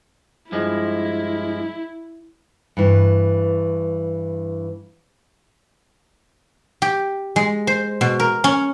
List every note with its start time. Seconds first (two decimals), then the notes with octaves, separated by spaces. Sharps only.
0.52 G2 F3 G#3 E4
2.77 G2 E3
6.82 G4
7.36 G#3
7.67 C5
8.01 B2
8.20 A#4
8.44 C#4